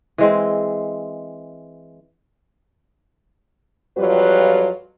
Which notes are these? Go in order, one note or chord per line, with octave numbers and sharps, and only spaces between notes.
E3 G#3 C4
F2 F#3 G3 F4 B4 C#5